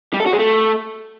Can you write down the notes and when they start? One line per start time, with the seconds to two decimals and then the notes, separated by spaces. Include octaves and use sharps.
0.14 G3
0.20 A4
0.26 F#4
0.33 G#3
0.39 A3